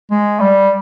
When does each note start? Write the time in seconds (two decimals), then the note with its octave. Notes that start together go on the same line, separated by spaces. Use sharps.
0.11 G#3
0.40 G3